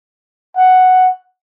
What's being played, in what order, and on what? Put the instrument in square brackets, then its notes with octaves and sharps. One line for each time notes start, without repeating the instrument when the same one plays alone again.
[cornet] F#5